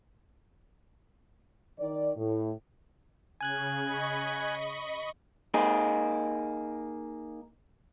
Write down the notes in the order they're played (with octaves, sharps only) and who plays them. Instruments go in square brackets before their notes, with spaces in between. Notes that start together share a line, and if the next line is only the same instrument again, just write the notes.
[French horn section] D#3 D5
A2
[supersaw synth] C#3 [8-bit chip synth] G#5 F#6 G#6
[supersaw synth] D#5 B5 C#6
[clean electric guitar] A#3 D#4 G#4